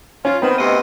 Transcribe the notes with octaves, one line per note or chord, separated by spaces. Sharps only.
C#4 F4
D#3 B3 C4 A#5
D2 C3 D#5